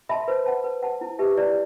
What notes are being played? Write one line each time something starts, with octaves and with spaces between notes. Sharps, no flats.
E5 A5 B5 C6
B4 C5
F#5 A5
B4
F#5 A5
E4
G4 B4 E5 A5
E4 D5